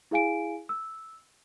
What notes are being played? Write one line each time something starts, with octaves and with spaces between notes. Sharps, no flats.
E4 G#4 F5 G#5 D7
E6